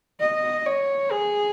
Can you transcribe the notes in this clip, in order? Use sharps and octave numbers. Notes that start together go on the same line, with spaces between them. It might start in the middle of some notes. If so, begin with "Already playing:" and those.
D#5
C#5
G#4